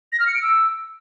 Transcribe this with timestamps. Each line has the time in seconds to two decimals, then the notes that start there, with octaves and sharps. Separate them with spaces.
0.12 A#6
0.20 F6
0.27 C#7
0.35 D7
0.42 E6